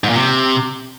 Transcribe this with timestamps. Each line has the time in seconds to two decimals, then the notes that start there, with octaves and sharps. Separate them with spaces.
0.04 G#2
0.10 A#2
0.15 C3